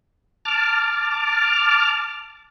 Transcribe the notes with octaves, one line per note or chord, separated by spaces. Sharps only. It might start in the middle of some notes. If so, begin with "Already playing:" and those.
A5 D6 F6